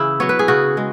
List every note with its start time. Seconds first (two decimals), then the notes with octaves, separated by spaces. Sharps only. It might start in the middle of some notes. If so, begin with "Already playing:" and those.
Already playing: C#3 E3 E4 G#4
0.20 F#3 B3 C#5
0.29 B4
0.39 G#4
0.48 C#3 F#4
0.77 G#3